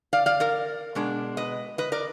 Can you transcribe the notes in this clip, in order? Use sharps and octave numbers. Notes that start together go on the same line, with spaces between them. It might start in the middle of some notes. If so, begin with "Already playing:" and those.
D5 F5
D5 F5
A#4 D5
B2 G#3 D4
B4 D#5
B4 D#5
A#4 D5